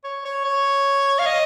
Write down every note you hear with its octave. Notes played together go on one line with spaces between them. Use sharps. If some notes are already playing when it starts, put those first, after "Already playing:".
C#5
C#5
C#5
F5
D#5